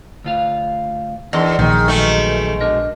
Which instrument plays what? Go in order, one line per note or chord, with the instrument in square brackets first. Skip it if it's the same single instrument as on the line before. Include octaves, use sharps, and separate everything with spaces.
[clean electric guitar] D2 F4 F5
[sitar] E2 [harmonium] D#3 D4 [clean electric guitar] D#5 C6
[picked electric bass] A#1 [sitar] D#3 [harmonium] G#4
[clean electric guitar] B1 E5 G#5 [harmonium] B2 G#3 [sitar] D#3 A3
[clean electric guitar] D4 A#4 D#5